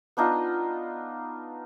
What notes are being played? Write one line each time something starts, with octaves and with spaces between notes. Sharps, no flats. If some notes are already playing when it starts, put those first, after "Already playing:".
B3 D4 D#4 F4